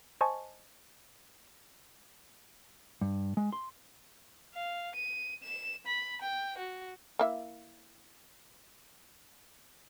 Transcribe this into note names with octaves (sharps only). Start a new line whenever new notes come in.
C5 D#5 G#5 A5 C#6
G2
G#3
C6
F5
D#7
E7
B5
G5
F#4
A#3 E4 E5